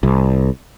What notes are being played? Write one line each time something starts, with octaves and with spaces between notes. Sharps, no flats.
C2